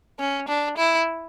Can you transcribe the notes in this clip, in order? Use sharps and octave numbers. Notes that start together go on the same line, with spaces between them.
C#4
D4
E4